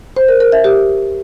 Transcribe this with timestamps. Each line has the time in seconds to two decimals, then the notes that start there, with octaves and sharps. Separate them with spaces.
0.16 C5
0.28 A#4
0.40 A#4
0.52 E5
0.64 G4